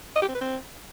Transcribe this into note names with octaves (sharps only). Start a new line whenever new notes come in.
D#5
G4
C4
B4
C4